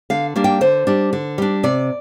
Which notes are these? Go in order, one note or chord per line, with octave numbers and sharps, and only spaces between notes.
D3 F5
G3 A#3 D4
G5
D3 C5
G3 D4
D3
G3 D4
C3 D5